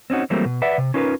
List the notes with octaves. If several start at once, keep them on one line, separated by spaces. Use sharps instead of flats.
C4 C#4 D#4 F#4
E3 F#3 G3 A3 A#3 C4
B2
B4 D5 E5 F#5
C3
C#4 D#4 F4 A#4 B4